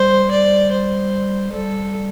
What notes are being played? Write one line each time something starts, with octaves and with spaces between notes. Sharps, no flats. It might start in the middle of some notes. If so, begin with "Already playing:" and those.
Already playing: G3 C5
D5
C5
G3 A4